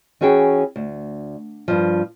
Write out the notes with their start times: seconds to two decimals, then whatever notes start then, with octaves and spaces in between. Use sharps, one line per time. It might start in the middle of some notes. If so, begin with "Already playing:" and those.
0.21 E3 C#4 F#4 G#4 G5
0.76 D2
1.68 G2 F3